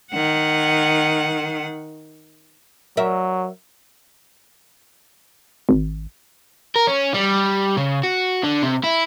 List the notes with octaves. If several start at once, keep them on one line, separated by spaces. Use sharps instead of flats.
D#3 F#5
F#3 A#4 E5
G#1
A#4
C#4
G3
C#3
F#4
D3
C3
E4